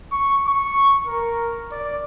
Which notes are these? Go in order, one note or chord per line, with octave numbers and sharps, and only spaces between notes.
C#6
C#6
A#4
D5